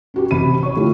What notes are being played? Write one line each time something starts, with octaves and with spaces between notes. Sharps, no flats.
C#4 F#4 G4
A1 C3 B5 D#7
C#5 C#6
D3 A3 E4 F4 G4